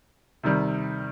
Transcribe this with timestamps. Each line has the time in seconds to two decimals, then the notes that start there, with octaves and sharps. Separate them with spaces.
0.43 C3 D#3 G3